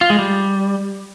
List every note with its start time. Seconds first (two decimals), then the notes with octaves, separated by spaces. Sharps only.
0.01 F4
0.10 G#3
0.19 G3